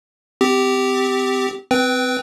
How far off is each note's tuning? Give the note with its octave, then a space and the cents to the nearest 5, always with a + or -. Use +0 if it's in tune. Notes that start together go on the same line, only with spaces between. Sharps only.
C4 -35 G4 +0
C4 -25 B4 +5 G5 +0